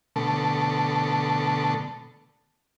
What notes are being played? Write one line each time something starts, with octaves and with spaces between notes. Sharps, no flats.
B2 D3 A3 A4